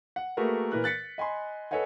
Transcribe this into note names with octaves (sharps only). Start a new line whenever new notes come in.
F#5
A3 A#3 F#4 G#4 A#4 B4
A#2 E3 A#4 B4 F#6
F#6 A6 B6 C#7
D#5 G#5 B5 C6
A4 B4 C#5 D#5 F#5 G#5